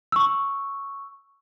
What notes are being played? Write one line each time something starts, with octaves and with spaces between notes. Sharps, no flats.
C#6 E6